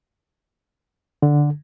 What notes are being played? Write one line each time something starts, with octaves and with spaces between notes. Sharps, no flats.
D3